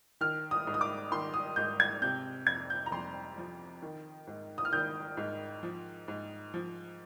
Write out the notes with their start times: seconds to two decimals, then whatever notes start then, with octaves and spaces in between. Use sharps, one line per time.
0.21 D#3 F6
0.51 D#6
0.67 G#2
0.74 D#6
0.81 D6
1.11 D#3 C6
1.34 D#6
1.56 G#2 G6
1.80 G#6
2.02 C3 G6
2.47 F2 G#6
2.70 G6
2.86 A#5
2.92 F2 C6
3.38 F3
3.82 D#3
4.27 G#2
4.58 D#6
4.65 F6
4.72 D#3 G6
5.17 G#2
5.63 F3
6.08 G#2
6.54 F3